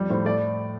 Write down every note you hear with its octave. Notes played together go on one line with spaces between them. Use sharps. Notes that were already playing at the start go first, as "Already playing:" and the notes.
Already playing: F2 G3
A2 C5
A3 D5